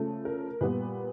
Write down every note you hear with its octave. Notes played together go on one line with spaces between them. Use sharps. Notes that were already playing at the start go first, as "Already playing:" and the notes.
Already playing: C#3 F3 A3
A#4
A#2 G3 B3 B4